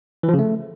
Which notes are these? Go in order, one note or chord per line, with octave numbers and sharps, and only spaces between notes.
E3
F3
C#3
A3